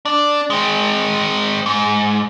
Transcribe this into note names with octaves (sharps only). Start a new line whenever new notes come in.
D4
G#3 C4
G#2